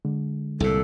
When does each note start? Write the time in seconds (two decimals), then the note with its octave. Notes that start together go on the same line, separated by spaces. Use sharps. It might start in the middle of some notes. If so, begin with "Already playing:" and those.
0.05 D3 G#3
0.60 C2 A#2 A4